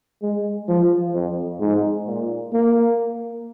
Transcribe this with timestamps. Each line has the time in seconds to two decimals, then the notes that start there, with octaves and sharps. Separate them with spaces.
0.22 G#3
0.69 F3
1.14 F2
1.60 G#2
2.07 A#2
2.53 A#3